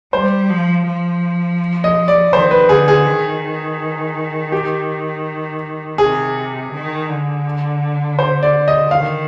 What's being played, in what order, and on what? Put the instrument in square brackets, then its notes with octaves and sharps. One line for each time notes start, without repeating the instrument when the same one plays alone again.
[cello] G3 [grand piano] C5
[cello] F3
F3
[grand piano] D#5
D5
[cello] D#3 [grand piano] C5
[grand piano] B4
[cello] D3 [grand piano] G#4
[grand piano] G#4
[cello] D#3
[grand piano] G4
[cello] C3 [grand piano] G#4
[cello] D#3
D3
[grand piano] C5
D5
D#5
[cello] D#3 [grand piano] F5